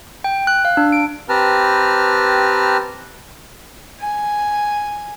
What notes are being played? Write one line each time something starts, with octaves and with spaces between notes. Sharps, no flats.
G5
F#6
F5
D4
D7
C4 G4 B4 A5 A#5 F6
G#5